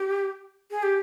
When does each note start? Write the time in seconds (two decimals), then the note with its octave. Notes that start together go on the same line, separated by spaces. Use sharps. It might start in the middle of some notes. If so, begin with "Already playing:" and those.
Already playing: G4
0.71 G#4
0.83 G4